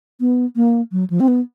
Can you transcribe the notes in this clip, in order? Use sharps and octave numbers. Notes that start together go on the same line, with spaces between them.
B3
A#3
F#3
F3
C4
B3